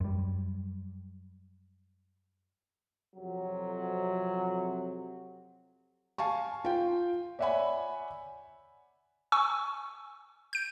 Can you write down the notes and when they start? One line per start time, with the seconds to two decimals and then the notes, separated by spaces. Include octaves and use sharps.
0.01 F#2 G3
3.16 F2 C3 F#3
6.18 F5 G#5 A5 C#6
6.64 F4 G5
7.39 C#5 D5 E5 F#5 G#5 B5
9.32 G#5 C#6 E6
10.53 G6 D7